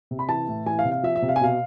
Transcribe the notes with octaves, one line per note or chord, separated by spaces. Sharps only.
C3
B5
E3 A5
A2
E3 G#5
F5
C3
F5
F3 E5
E5
C3
F5
G#5
B2 F5